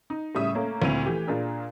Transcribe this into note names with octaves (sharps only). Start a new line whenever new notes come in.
D#4
A2 C#3 G3 E5 D#6
A3 A#3 C#4
D2 A#2 C4 E4 D#7 F7
E3 A3 G4
A#2 D4 F4 G#4 A#4